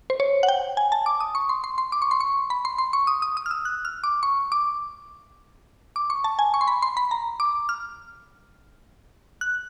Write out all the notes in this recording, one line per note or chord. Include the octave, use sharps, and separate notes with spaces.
C5
C#5
F#5
G5
G#5
A5
D6
D#6
C#6
C6
C6
C6
D6
C#6
C6
C#6
B5
C6
C6
C#6
D#6
D#6
D#6
F6
E6
F#6
F6
D6
C#6
D6
D6
C#6
A5
G#5
C#6
C6
B5
C6
B5
A#5
D6
F6
F#6